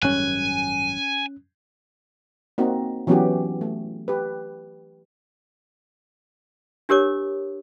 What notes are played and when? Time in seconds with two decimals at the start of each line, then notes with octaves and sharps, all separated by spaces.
0.02 G#1 F#2 G3 C#4 G#5 F#6
2.58 A#3 C4 D#4 F#4
3.07 E3 F#3 B3 C#4 F#4 G4
3.61 A3
4.08 G4 B4
6.89 D4 G4 A#4 C#5 D6